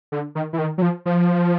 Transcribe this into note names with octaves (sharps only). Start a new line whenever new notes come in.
D3
D#3
E3
D#3
F#3
F3
F3